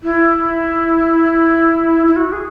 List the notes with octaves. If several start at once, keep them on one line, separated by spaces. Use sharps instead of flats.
E4
E4
F#4
G#4